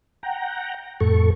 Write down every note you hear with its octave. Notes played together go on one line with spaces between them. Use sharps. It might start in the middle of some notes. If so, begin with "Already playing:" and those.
F#5 G5 A#5
F2 A2 A4 C#6